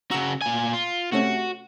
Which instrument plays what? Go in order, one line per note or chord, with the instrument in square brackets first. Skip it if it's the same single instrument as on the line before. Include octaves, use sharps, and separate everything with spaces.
[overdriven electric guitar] C#3 F#4 [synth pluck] A#5 E6
[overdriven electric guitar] A#2 G#5
F4
[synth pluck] C3 A3 C#4 [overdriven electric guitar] F#4